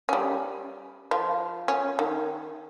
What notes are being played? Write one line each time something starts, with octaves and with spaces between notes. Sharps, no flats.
G3 C#4
F3 F4
C#4
D#3